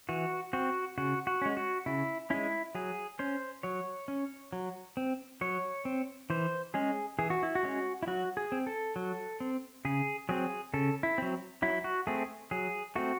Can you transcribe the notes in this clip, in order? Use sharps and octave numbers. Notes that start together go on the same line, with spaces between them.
E3 F#4
C4 F#4
C#3 F#4
F#4
G#3 C#4
F#4
C#3 E4
G#3 C#4 E4
F#3 G#4
C#4 C5
F#3 C#5
C#4
F#3
C4
F#3 C#5
C4
E3 C5
G#3 C#4 G#4
E3 G#4
F#4
E4
F#4
G#3 C#4
E4
F#3 F#4
G#4
C4
A4
F#3
C4
C#3 G#4
F#3 C4 G#4
C#3 A4
E4
F#3 C4
F#3 E4
F#4
A3 C4 G#4
F#3 G#4
A3 C4 F#4